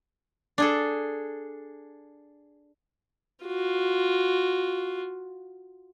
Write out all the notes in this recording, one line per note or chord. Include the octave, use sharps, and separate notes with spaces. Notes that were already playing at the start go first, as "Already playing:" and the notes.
D4 G#4 A4
F4 F#4